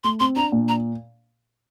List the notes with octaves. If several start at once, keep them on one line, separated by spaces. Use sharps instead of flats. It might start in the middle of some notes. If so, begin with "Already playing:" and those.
A3 C6
C4 C6
D4 A#5
A#2
A#5